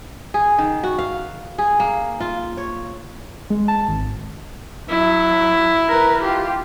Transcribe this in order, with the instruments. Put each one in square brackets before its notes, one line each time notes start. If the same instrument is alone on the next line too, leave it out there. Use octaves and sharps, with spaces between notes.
[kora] G#4
D#3
F#4
F5
G#4
A#3
F4
C#5
[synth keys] G#3
A5
G#1
[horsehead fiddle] F#3 [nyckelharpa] E4
[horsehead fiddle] A#4 B4
F4 G4